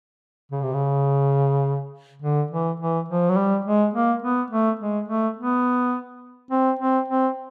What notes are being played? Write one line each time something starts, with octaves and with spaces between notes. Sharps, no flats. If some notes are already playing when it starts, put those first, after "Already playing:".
C#3
C3
C#3
D3
E3
E3
F3
F#3
G3
G#3
A#3
B3
A3
G#3
A3
B3
C4
C4
C4